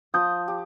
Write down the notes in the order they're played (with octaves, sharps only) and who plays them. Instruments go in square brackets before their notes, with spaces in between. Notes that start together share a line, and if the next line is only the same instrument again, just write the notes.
[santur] F3 [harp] D#6 G6
[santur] G4